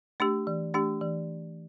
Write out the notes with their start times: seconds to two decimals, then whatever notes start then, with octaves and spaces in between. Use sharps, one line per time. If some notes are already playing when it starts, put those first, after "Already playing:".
0.20 A3 D4 G4
0.47 E3
0.74 A3 D4 G4
1.01 E3